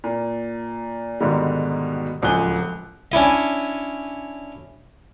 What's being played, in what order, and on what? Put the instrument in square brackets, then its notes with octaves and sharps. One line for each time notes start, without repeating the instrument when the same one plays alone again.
[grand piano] A#2
G#2 B2 D3 D#3 G3
D1 C#2 F3 G#5 F#6 G7
[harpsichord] C#4 D4 E4 D#5